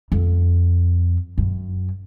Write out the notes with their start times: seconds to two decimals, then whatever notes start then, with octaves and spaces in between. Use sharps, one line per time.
0.12 F2
1.38 F#2